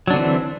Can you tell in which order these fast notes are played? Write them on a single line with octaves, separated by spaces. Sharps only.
F#3 D4 D3 C4 E3